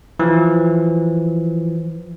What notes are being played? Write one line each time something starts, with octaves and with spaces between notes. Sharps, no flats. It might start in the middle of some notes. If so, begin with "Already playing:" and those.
E3 F3